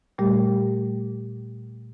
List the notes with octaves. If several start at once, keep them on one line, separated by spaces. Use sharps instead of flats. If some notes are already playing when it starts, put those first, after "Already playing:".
A#2 G3 A3 G4